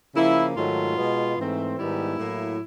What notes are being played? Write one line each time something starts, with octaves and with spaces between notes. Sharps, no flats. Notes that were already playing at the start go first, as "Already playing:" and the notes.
C#3 F3 A#3 E4
G#2 D#3 F#3 A3 F4
B2 G#3 B3
G#2 E3 A3 C4
G#2 D#3 G3 B3 E4
A2 F#3 A#3